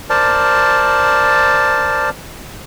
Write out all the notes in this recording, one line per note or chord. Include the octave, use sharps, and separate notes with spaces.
A#4 C5 D5 A5